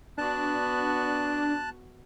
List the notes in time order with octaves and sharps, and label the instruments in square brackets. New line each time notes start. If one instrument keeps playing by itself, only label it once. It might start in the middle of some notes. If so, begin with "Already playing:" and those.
[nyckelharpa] B3 F#4 [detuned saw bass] D4 [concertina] A5 F#6